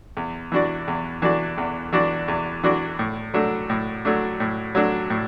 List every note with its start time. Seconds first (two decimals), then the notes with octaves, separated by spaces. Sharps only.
0.17 E2
0.52 E3 D4 F#4 D5
0.88 E2
1.22 E3 D4 F#4 D5
1.58 E2
1.93 E3 D4 F#4 D5
2.28 E2
2.63 E3 D4 F#4 D5
2.99 A2
3.34 F#3 A3 D4
3.70 A2
4.05 F#3 A3 D4
4.40 A2
4.75 F#3 A3 D4
5.10 A2